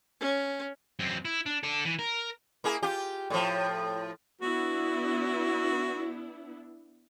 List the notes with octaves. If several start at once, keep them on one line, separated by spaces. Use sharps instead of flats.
C#4
F#2 C4
E4
D4
A4 D5
E3
A#4
A#3 E4 G#4
F4 G4
A2 F3
B3 D4 E4 F#4